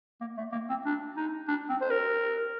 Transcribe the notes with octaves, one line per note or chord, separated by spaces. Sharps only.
A#3
A3
A#3
C4
D4
D#4
D4
C4
C5
A#4